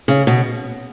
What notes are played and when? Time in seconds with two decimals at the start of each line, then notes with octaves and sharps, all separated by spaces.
0.08 C#3
0.27 B2